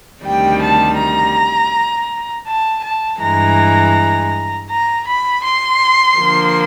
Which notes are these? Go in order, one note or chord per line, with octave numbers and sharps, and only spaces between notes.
D2 C3 D#3 G3 G5
A5
A#5
A5
A5
G2 E3 G#3 A#5
A#5
B5
C6
D3 F3 A#3